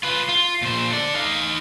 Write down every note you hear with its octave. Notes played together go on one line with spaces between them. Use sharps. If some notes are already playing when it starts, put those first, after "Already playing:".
F4 B4
F4
A#2 C5
A4 D5
D#4 F5